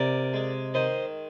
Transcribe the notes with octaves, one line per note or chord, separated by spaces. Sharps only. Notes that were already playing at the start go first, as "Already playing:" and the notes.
Already playing: C3 A#4 D5
G#3
D#3 C5 D#5